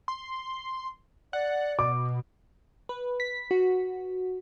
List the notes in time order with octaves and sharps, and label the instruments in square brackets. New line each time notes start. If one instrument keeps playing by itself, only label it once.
[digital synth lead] C6
[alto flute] D5 [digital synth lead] F#5
[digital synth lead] B2 [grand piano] D6
[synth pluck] B4
B6
F#4